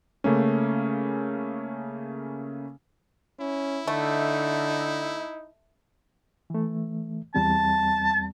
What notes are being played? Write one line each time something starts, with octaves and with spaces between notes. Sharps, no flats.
C#3 A3 A#3 C#4
C#4 E4
D3 A3 D#4
E3 A3
E2 G3 C4 A5